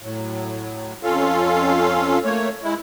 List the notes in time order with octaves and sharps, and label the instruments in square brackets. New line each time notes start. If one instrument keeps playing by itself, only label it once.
[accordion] A2 F#3
F2 C#4 F4 A4 F5
A3 A#3 C#5
G#3 E4